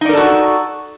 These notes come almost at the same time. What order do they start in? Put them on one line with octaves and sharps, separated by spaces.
D#4 D5 A#4 A4 F#4